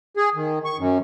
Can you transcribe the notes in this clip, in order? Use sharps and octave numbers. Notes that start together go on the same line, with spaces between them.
G#4
D#3
C#6
F#2